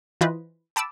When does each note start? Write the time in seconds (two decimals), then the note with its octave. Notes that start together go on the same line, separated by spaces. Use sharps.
0.21 E3 F4 B4 C5 D#5
0.76 G5 A5 B5 D6 E6